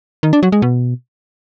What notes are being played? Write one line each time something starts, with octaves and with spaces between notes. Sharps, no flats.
D#3
D4
F#3
G#3
B2